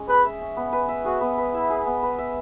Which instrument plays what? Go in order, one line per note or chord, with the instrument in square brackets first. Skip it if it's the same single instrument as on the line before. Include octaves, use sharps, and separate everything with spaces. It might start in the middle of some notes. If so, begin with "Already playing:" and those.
Already playing: [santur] G#3 C#4
[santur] G#4 [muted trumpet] B4
[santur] E5
C#4
B3
B4
E5
[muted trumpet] F#4 [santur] G#4
[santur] B3
B4
[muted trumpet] E4 [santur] E5
[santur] G#4
B3
B4
E5